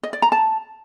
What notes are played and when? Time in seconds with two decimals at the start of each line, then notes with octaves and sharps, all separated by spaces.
0.03 D#5
0.13 D5
0.22 A#5
0.32 A5